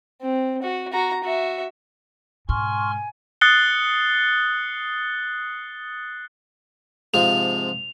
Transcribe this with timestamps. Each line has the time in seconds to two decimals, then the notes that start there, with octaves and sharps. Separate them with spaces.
0.22 C4
0.62 F#4
0.93 F#4 A#5
1.24 F#4 E5
2.49 G#2 B2 G#5 C6 C#6 F6
3.41 D#6 F#6 A6 C7 C#7 G7
7.14 G#2 C3 F3 F7